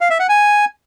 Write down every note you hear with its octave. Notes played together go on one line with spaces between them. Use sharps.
F5
E5
F#5
G#5